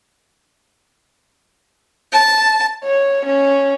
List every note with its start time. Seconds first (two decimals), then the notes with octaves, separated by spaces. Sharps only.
2.12 A5
2.84 C#5
3.26 C#4